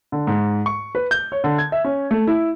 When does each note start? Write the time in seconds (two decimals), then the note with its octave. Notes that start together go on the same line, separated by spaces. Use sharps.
0.12 D3
0.27 G#2
0.66 C#6
0.95 B4
1.11 G6
1.32 C#5
1.44 D3
1.58 G#6
1.72 E5
1.84 C#4
2.11 A3
2.27 E4